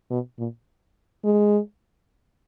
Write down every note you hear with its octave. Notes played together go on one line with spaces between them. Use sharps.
B2
A#2
G#3